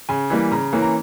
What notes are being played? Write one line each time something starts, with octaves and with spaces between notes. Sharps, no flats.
C#3 G#5
E3 G3 A#3
C#3 A#5
E3 A#3 C#4
A#5